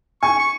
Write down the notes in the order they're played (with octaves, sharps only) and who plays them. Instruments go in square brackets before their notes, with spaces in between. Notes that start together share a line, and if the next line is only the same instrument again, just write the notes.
[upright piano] G#5 [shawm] C#6
[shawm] C#6